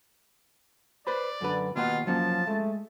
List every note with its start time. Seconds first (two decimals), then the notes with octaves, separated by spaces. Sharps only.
1.07 B4 C5 D5 B5
1.41 F#2 D3 B4
1.76 D#2 B2 A#3 F4 F#5
2.07 F3 F#3 A#3 C#4 A5
2.47 G#3 A3